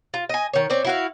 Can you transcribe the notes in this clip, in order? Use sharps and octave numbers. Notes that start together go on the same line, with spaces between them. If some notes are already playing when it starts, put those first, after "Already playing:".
F4
D#5 G#5
D#3 C#5
C4 C#4 D5
E4 F#4 F5